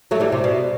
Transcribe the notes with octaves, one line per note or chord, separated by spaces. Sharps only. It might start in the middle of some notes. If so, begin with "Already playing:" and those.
F#3 A3
E3 G3
C3
B2